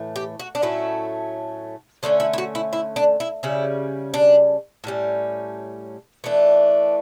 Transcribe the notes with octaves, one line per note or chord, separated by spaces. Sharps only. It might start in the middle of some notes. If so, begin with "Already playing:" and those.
Already playing: A2 E3 A3
G4
F#4
D4
A2 F#3 A3 C#4 E4
D3 A3 C#4 D4
E4
E4
F#4
E4
E4
D4
E4
C#3 G3 C#4 E4
D4
A2 G3 C#4
E3 A3 D4